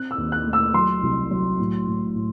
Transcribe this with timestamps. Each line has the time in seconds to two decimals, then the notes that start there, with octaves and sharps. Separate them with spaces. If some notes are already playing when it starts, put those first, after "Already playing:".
Already playing: C4 F#6
0.11 E6
0.18 D#2
0.32 F#6
0.46 A3
0.53 E6
0.74 F#3 C6
1.03 C2
1.31 F#3
1.59 A2
1.87 A2
2.15 A2